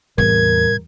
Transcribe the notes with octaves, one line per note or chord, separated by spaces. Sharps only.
E2 A2 C3 G3 A#4 G#6